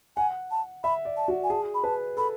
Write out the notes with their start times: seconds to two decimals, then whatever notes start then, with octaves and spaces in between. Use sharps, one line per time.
0.16 F#5 G#5
0.51 A5
0.84 E5 B5
1.05 D5
1.17 A5
1.28 F#4
1.43 G#5
1.50 G#4 A5
1.74 B5
1.84 B4 A5
2.17 A4 B5